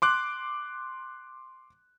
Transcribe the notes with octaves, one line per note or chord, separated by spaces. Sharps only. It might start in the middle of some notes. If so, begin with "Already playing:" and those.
C6 D6 F#6